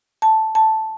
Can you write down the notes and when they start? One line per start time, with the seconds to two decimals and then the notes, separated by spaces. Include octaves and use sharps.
0.22 A5
0.55 A5